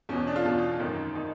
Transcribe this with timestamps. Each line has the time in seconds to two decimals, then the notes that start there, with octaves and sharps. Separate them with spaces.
0.09 E2 B2 C#4
0.27 D4
0.36 F4
0.45 E2 B2
0.80 G#1 F#2 D#3
1.15 D#3 D#4